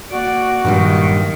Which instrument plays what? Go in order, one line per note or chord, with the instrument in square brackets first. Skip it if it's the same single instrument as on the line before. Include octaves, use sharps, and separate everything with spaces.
[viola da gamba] A#3 D5 [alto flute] F#4
[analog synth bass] G2 [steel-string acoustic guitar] A#2 F#3 G3 [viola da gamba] D#3